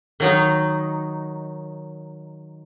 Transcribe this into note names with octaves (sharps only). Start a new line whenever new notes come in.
D#3 F#3 D#4